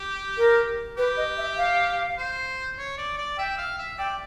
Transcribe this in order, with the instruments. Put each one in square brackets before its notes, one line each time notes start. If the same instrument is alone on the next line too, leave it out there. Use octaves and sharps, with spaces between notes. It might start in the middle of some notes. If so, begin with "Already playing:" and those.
Already playing: [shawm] G4
[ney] A#4
[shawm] G4 [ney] B4
[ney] D#5
E5
F5
[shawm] C5
C#5
D5
D5
[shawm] E5 [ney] G5
[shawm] F5
E5
[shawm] D5 [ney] G5